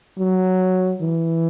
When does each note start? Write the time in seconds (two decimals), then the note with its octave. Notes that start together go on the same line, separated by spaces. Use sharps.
0.19 F#3
1.02 E3